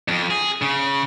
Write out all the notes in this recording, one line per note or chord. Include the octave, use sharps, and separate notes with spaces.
F2
G#4
C#3